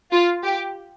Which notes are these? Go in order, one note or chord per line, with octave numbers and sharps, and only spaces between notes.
F4
G4